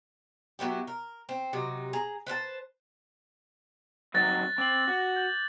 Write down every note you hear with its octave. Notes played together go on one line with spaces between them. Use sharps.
F#3 B3 E4 G4
A#4
C4
C3 F#3 D#4
G#4 A#5
B4 C5 F5 A5
F#3 C4 D#4 F#6 A6 A#6
C4 D6 F#7
F#4
G6